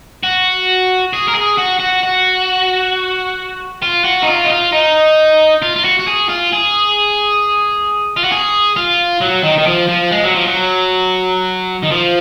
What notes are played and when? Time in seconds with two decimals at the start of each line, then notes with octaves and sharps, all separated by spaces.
0.23 F#4
1.13 G#4
1.28 A#4
1.35 G#4
1.58 F#4
1.80 F#4
2.03 F#4
3.82 F4
4.04 F#4
4.23 D#4
4.27 F4
4.45 D#4
4.50 F4
4.72 D#4
5.62 F4
5.76 F4
5.84 F#4
5.99 F#4
6.07 G#4
6.29 F4
6.52 G#4
8.17 F4
8.24 F#4
8.32 G#4
8.76 F4
9.21 F#3
9.43 D#3
9.58 D#3
9.66 F3
9.89 F3
10.11 G#3
10.23 F#3
10.35 F3
10.47 F#3
11.83 D#3
11.91 F3